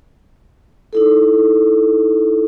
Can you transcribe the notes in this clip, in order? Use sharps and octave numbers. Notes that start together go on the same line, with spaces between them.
D#4 E4 A4